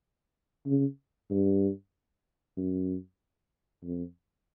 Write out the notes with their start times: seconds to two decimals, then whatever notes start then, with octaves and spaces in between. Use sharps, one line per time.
0.66 C#3
1.30 G2
2.57 F#2
3.84 F2